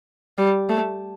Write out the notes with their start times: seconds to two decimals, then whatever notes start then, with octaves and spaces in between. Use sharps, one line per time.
0.38 G3
0.69 A3